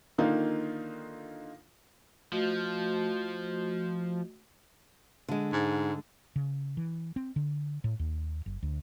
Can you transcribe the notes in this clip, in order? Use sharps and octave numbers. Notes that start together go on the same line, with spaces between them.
D3 D#3 A#3 D#4 F4
F3 A3 F#4 D#5
D3 G#3
G#2
C#3
E3
C4
D3
A2
D#2
F#1
D2